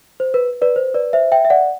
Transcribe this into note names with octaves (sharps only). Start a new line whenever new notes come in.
C5
B4
B4 D5
C5
B4 D5
C5 E5
E5 G5
E5
D5 F#5